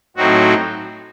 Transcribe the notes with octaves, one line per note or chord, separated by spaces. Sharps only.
A2 F#3 C4 D#4 F#4